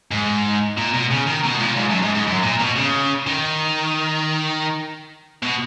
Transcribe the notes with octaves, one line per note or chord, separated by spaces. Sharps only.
G#2
A#2
B2
C#3
D#3
B2
G#2
A#2
G#2
F#2
G#2
G#2
F#2
A#2
B2
C#3
D#3
B2